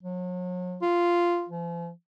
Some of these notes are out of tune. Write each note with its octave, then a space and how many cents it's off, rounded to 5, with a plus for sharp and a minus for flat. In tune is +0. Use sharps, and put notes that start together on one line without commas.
F#3 -40
F4 -5
F3 -40